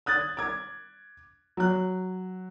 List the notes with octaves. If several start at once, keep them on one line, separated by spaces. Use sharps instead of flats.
D#6 F#6 G#6 A6
D6 G#6
F#3 F#6